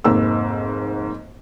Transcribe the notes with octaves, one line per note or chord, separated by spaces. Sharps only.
F1 G#2 A#3 E6